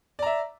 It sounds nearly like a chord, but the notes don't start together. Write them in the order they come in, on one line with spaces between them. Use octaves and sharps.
D5 A#5 E5